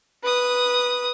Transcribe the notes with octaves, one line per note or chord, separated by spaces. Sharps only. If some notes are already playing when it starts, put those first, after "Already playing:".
B4 D#6